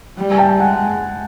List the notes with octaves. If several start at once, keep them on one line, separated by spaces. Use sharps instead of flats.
G3
G#5
G5 A5
G#3 F#5 G#5